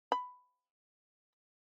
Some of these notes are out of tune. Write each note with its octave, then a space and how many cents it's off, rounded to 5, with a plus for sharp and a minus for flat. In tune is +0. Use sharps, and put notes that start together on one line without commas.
B5 +10